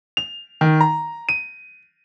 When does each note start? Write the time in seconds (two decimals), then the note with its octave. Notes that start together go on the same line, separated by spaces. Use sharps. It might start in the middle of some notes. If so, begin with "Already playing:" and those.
0.17 F7
0.61 D#3
0.81 A#5
1.29 D#7